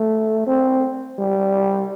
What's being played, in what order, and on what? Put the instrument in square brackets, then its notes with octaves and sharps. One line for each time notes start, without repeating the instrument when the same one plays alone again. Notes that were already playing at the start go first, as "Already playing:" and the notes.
Already playing: [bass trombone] A3
C4
G3